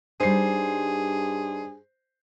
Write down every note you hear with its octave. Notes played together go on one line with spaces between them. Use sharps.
G2 G3 D#4 G#4 C5 C7